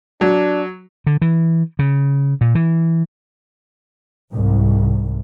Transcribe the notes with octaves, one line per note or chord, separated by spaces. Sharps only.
F#3 D4
D3
E3
C#3
A#2
E3
C2 G#2